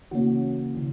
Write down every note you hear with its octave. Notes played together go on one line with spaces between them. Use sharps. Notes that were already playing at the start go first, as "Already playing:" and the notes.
C#3 E3 A#3 C#4 F#4
C#3 E3